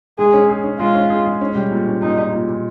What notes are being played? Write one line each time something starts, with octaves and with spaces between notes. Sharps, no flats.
G#3 G#4
C#4
G#4
C#4
G#3 F4
C#4
G#4
G#3
C#4
G3
A#2
C#4
A#2 D#4
A#2
A#2
A#2